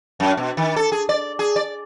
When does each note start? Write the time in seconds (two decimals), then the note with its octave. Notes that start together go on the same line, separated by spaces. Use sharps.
0.20 F#2
0.37 B2
0.57 D#3
0.76 A4
0.92 G#4
1.09 D5
1.39 G#4
1.56 D5